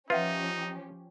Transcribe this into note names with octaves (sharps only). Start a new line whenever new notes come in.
F3 C#4 D#4 F4 G4 B4 E5 F#5